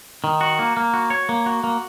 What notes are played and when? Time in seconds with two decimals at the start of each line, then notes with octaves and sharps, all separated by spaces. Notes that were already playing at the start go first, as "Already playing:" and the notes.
0.24 D#3
0.41 F#4
0.59 A#3
0.77 A#3
0.94 F#4
1.10 C#5
1.29 A#3
1.46 F#4
1.64 A#3